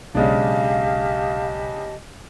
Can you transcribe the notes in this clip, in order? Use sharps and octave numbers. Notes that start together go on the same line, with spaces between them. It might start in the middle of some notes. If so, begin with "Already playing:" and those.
B1 C#3 G#3 D4 G4 D#5 F5 A5